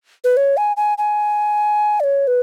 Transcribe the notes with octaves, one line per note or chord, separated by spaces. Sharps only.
B4
C#5
G#5
G#5
G#5
D5
C#5
B4